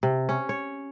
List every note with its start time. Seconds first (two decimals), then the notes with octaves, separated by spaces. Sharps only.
0.03 C3
0.29 C#4
0.49 C#5